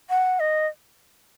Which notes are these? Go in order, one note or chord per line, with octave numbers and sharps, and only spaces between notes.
F#5
D#5